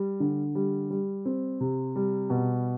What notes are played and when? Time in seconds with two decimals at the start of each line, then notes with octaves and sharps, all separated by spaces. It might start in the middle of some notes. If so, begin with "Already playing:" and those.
Already playing: G3
0.20 D3
0.55 G3
0.90 G3
1.25 C4
1.60 C3
1.96 G3
2.30 B2